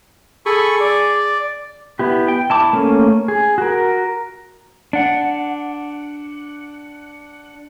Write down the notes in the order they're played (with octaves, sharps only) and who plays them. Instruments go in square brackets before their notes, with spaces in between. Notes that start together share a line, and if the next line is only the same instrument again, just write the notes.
[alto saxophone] G#4 [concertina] A4 B5 C#6
[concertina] D5
[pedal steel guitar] B3 E4 G4
G5
E4 A5 D6
A3 A#3 C#4
G#4
F#4 A#4
[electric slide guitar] D4 F#5